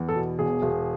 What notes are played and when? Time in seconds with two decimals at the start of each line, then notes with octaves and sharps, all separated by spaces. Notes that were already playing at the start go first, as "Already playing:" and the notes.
Already playing: E2
0.09 A4
0.16 B2
0.39 E1 G#4
0.62 E1